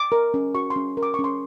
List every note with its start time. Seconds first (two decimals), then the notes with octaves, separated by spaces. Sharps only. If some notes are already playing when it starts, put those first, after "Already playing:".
Already playing: D6
0.12 A#4
0.34 C#4
0.55 F#4 C#6
0.70 C6
0.76 C#4
0.97 A#4
1.03 D6
1.14 C#4 C#6
1.24 C6